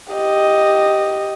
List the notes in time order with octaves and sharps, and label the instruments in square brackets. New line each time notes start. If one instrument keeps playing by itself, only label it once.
[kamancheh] G4 D#5